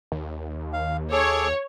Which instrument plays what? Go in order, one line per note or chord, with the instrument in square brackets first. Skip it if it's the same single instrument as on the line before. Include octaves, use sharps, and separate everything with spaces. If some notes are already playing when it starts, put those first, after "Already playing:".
[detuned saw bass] D#2
[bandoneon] F5
[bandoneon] G#4 A4 D6 [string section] C#5